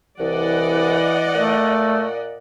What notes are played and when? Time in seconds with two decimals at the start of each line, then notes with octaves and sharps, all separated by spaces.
0.20 C2 E3 D5 D#5 F#5
1.35 A#2 A3